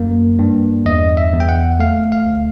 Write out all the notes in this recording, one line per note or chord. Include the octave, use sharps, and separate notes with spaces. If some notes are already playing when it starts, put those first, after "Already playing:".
Already playing: F#2 A#3
G2
E2 D#5
E5
E2
G5
F#5
A3 F5
F5
D2